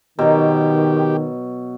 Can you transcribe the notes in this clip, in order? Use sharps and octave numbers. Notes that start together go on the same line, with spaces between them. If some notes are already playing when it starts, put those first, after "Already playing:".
B2 D#3 F#3 G4